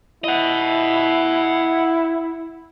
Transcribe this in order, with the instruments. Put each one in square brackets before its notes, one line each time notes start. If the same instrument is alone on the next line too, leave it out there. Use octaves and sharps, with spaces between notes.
[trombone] E4 [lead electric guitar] D#5 F#5